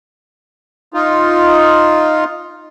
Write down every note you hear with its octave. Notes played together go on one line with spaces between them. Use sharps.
D#4 F4